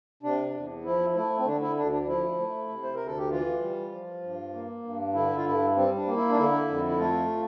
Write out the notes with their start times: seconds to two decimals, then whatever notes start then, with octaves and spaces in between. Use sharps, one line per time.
0.23 C3 D4
0.54 E2
0.84 F3 E4
1.15 A3 E4
1.38 C4
1.45 D3 D4
1.61 E4
1.77 D2 D4
1.92 D4
2.02 D4
2.07 F3 E4
2.39 A3
2.69 C3
2.83 C5
2.95 D2 A#4
3.07 A4
3.18 G4
3.30 E3 F4
3.61 G3
3.91 F3
4.23 G2
4.53 A#3
4.84 G2
5.14 D3 E4
5.37 F4
5.45 G2 E4
5.76 G3 C4
5.96 D4
6.07 A#3
6.16 E4
6.30 D4
6.37 D3 E4
6.68 F2
6.87 E4
6.98 A3 F4